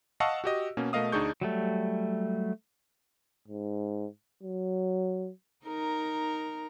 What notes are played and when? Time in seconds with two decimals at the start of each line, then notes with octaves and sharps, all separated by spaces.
0.20 D#5 F5 F#5 A5 C#6 E6
0.44 F#4 G4 D#5
0.77 B2 A#3 C#4
0.93 B2 A3 A#4 D#5 F5 D#6
1.12 D2 D4 D#4 G#4 C#6 G6
1.41 F#3 G3 A3
3.48 G#2
4.43 F#3
5.65 D#4 A#4